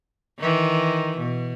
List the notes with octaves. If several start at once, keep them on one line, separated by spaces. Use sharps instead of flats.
D#3 E3
B2